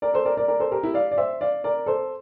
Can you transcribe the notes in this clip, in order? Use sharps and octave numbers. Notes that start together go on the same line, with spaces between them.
A#4 D5
A4 C5
A#4 D5
A#4 D5
A#4 D5
A4 C5
G4 A#4
E4 G4
D5 F5
D5
C5 E5
D5 F5
A#4 D5
A4 C5